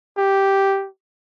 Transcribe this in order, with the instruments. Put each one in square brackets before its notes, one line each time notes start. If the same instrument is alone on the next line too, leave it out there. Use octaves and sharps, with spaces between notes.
[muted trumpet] G4